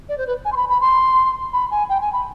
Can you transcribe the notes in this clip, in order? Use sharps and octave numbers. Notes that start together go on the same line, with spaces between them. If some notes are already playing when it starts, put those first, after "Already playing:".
D5
C5
B4
G#5
C6
B5
B5
C6
B5
G#5
G5
G#5
B5